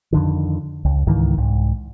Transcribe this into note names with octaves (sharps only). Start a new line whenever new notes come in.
F2 D3 D#3
C#2
C#2 G#2 D#3 E3
C2 G#2